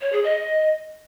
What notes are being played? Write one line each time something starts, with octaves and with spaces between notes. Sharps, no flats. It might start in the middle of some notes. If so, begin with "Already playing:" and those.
C#5
G#4
D#5